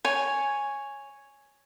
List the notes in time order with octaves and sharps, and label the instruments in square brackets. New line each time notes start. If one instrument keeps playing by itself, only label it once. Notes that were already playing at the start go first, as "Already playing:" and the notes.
[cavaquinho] C#5 G#5